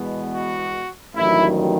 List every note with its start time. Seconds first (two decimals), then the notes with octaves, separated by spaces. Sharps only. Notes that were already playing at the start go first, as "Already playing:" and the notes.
Already playing: E2 B2 G#3 B3
0.34 F#4
1.15 A1 G2 D#3 F#3 E4